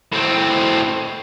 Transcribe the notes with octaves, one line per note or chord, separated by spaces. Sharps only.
A2 C4